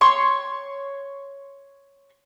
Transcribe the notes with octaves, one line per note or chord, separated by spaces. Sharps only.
C#5 C6 C#6